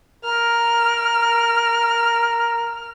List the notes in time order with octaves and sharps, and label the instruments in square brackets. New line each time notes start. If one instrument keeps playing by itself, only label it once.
[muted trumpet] A#4 [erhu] F6